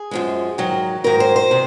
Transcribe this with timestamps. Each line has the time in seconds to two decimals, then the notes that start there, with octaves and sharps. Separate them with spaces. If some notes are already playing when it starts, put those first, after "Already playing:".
Already playing: G#4
0.11 F#2 F3 G#3
0.58 G#2 D#3 F#3
1.04 G#2 D#3 F#3 A#4
1.20 C5
1.36 C5
1.51 C3 D#3